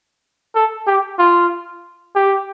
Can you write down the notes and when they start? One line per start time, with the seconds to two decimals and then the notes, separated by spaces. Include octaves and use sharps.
0.55 A4
0.87 G4
1.19 F4
2.15 G4